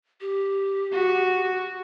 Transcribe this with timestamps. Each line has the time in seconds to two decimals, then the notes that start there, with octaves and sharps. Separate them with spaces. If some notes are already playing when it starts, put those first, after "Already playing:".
0.21 G4
0.92 F#4